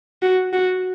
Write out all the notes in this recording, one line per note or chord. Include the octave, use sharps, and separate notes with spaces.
F#4
F#4